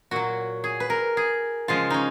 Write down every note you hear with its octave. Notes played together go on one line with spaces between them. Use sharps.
A#2 F#3 F#4
G#4
B4
A#4
G#4
C#3 F3 G#3 F4
C#4 D#4